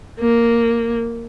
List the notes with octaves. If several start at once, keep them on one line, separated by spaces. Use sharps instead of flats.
A#3